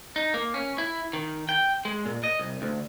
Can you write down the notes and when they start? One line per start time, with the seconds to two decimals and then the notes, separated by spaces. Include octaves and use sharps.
0.16 D#4
0.34 A#3
0.54 C#4
0.78 E4
1.13 D#3
1.49 G5
1.85 G#3
2.06 A#2
2.24 D#5
2.39 C2
2.62 D2